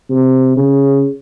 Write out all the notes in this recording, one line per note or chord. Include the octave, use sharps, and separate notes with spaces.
C3
C#3